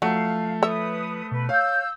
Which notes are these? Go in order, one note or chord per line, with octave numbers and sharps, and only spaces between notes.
F3 F#3 A3 F5
A4 B4 C#5 E5 D#6
B2 B4
C#5 F5 E6 G6